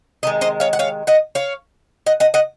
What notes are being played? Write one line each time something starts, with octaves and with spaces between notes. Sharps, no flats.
C3 D#3 G#3 D#5
C5 D#5
C#5 F5
F#5
C#5 F5
D#5 F#5
C#5 F5
D#5 F#5
D#5 F#5
D#5 F#5